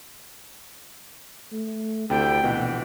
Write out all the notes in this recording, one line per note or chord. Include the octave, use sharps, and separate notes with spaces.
A3
D2 C3 E4 A4 G5
A#1 B2 E3 F#5